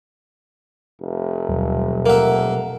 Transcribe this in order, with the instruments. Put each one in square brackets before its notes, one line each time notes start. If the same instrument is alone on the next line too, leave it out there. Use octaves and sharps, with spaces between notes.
[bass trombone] F1
[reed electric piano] D#2 [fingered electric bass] B2 F#3 G3
[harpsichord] A#3 E5 [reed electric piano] A#4 F#5